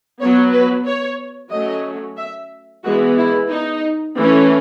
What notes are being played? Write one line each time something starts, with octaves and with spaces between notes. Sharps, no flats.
F#3 B3 C#5
B4
C#5
F#3 A3 C#4 D#5
E5
E3 G#3 B3 F#4
E4
D#4
E3 A3 C#4